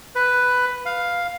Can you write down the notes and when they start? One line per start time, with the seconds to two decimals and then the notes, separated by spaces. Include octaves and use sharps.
0.15 B4
0.86 F5